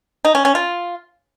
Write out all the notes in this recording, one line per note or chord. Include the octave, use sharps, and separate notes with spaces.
D#4
C#4
C#4
F4